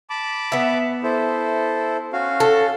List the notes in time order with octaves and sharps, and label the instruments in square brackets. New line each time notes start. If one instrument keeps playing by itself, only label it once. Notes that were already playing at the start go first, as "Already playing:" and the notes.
[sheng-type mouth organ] A5 B5 D6
[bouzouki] B3 E5
[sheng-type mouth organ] E4 A4 C5
C#4 F#4 F5
[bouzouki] A4